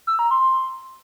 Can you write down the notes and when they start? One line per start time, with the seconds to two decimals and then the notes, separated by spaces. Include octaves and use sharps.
0.07 E6
0.19 A#5
0.31 C6